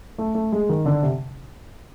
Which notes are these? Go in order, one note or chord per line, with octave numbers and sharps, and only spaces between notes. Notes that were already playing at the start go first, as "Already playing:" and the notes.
A3
A3
G#3
D#3
D3
C3